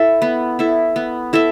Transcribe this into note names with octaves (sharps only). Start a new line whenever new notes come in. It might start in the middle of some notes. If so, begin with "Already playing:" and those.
Already playing: E4 A4 E5
B3
E4 A4 E5
B3
E4 A4 E5